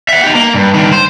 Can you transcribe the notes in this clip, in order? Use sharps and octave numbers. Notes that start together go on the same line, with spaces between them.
E5 F#5
D#4 G4
A#3
G2
G2 D#3
C5